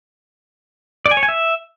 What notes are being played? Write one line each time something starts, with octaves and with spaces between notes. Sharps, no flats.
D5
G#5
C#5
G#5
E5